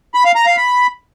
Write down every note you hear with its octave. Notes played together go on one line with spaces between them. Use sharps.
B5
F5
A#5
F5
B5